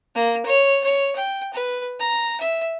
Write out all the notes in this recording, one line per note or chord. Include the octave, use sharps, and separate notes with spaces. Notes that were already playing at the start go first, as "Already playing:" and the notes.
A#3
C#5
C#5
G5
B4
A#5
E5